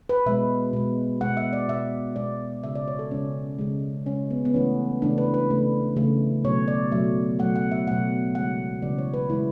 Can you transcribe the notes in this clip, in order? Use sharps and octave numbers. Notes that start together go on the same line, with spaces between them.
B4
B2 G#3 E5
B2 G#3
B2 G#3 F#5
E5
D5
B2 G#3 E5
B2 G#3 D5
C#3 G#3 E5
D5
C#5
A4
C#3 G#3 C#4
C#3 G#3
C#3 G#3 C#4
B3
B3
C#3 E3 A3 C#4
C#3 E3 A3 D4
B4
B4
C#3 E3 A3
C#3 E3 A3
B2 F#3 A3 C#5
D5
B2 F#3 A3 E5
B2 F#3 A3 F#5
F#5
E5
B2 F#3 A3 F#5
C#3 E3 G#3 F#5
C#3 E3 G#3 D5
C#5
B4
C#3 E3 G#3 E4